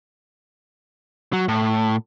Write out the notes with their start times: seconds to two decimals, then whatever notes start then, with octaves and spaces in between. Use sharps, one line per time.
1.33 F#3
1.48 A2